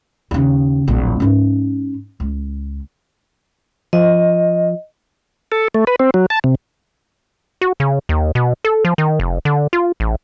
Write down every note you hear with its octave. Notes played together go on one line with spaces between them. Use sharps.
D#2 C#3
D1 A#1
G#2 C#4
C#2
F3 D#5
A4
A3
B4
C4
F#3
A5
C3
F#4
C#3
D#2
B2
A4
F3
D#3
F1
D3
F4
A1